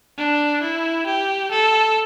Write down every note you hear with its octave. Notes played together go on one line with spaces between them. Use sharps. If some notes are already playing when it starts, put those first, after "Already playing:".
D4
E4
G4
A4